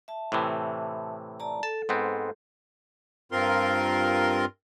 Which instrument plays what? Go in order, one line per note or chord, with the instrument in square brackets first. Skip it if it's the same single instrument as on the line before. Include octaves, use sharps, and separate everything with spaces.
[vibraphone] E5 A5
[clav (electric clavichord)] A2 C3 E3
[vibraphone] D5 A5 A#5
[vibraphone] A4 [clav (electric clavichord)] A5
[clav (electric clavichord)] G#2 B3 C4
[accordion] G2 C4 F4 A#4 C6